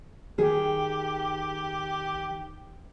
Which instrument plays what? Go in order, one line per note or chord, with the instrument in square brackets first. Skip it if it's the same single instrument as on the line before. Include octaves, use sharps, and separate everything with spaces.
[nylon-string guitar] D#3 G#4 [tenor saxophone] G4